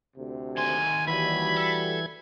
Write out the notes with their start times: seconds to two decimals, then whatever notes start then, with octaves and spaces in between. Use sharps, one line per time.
0.16 D2 C3
0.58 D#2 G#5 C6
1.07 E3 G3 F#4 B5 G#6
1.57 A4